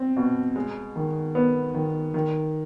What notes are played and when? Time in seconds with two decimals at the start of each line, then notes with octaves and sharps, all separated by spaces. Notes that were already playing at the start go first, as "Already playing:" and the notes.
Already playing: C4
0.16 B2
0.56 G#3
0.96 D#3
1.35 B3
1.74 D#3
2.14 D#3